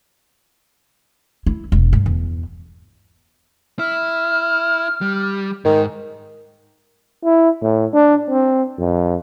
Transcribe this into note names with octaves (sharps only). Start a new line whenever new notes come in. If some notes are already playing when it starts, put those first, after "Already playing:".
E4
E1
G2
E2
E4 F6
G3
G#2 D#3
E4
A2
D4
C4
F2